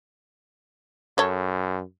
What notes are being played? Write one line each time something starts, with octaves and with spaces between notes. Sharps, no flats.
F#2 A4 C#5